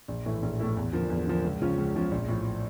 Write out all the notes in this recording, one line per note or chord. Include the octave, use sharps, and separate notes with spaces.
A#1
A2 E3 A3 E4
A#1
A2 E3 A3 E4
E2
D3 F3 A#3
E2
D3 F3 A#3
C#2
C#3 F3 C#4 F4
C#2
C#3 F3 C#4 F4
A#1
A2 F3